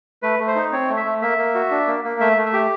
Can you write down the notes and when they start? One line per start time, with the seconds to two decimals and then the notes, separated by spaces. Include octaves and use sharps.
0.22 A3 B4
0.40 A3
0.47 C5
0.55 D#4
0.72 C4 C#5
0.89 A3
0.97 E5
1.05 A3
1.22 A#3 E5
1.38 A#3
1.55 F#4
1.71 D4
1.87 A#3
2.04 A#3
2.20 A3 E5
2.37 A3
2.46 E5
2.53 G4